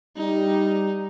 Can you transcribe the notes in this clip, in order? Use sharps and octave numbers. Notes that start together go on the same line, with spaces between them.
G3 D#4